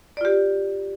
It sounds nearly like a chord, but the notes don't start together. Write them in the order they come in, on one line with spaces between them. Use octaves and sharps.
D5 F4 G4